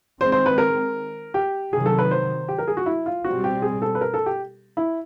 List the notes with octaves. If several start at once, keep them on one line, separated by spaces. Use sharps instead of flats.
D#3 G#3 C4 C5
C5
B4
A#4
G4
C3 D#3 F#3 G#4
A4
B4
C5
G4
A#4
G#4
F#4
E4
F4
B2 G3 C4 F#4
G4
G#4
A4
B4
A#4
A4
G4
E4